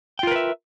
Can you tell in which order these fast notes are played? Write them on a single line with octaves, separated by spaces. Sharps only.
G5 F4 A#4 B4 E5